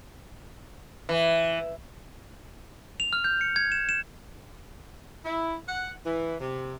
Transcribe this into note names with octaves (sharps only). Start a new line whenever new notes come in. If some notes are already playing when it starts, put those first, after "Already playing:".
E3
F7
F6
G6
C#7
G#6
E7
E7
E4
F#5
E3
C3